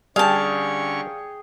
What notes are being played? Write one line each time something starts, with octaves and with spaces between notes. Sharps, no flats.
D3 G3 C#4 G#4 F5 G5 A5 C#6